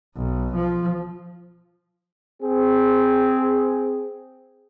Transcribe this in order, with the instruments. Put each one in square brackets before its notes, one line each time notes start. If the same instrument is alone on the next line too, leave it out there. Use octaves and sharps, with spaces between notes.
[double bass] B1
F3
[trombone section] C4 G#4